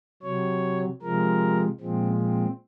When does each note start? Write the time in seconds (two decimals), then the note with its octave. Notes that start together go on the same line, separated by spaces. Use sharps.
0.22 C3 F#3 C#5
1.02 C3 F3 G#3 A#4
1.80 A#2 F3 G#3 C4
2.20 C4